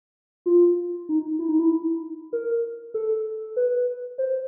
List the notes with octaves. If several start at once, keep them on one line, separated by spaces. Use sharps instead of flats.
F4
D#4
E4
D#4
E4
A#4
A4
B4
C5